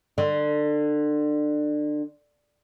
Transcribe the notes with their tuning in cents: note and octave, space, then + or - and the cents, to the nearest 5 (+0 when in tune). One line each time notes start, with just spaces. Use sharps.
D3 +25